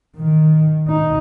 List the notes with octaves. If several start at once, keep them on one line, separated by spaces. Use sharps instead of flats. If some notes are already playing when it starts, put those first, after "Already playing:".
D#3
D#4